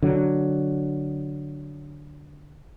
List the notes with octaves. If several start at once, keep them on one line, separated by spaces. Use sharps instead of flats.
D3 F#3